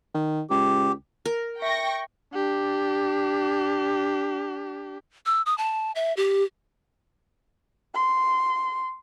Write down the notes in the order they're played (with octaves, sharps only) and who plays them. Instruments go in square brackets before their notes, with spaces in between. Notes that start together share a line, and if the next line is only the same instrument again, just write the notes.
[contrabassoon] D#3
[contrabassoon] C#2 [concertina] G4
[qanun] A#4
[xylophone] E5 [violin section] G5 C#6 A#6
[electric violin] D4 G4
[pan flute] E6
D#6
A5
E5
G4
[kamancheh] C6